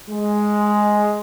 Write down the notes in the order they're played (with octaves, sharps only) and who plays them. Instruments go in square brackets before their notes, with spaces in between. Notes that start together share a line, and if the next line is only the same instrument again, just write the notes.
[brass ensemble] G#3